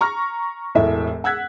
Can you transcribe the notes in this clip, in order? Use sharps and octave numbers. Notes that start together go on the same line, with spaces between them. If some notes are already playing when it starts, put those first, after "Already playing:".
A#5 C#6 F6 A#6
E1 A2 E5
F#5 E6 F#6 G#6 B6